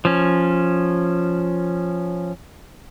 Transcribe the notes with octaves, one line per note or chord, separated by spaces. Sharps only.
F3 C#4